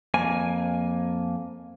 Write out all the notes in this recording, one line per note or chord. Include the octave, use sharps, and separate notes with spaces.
F2 A#3 G#5